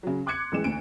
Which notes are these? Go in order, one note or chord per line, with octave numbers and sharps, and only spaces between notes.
C#3 F#3
C6 D6 F#6 G#6 C#7
A1 E3 G#3 E7
D2 D7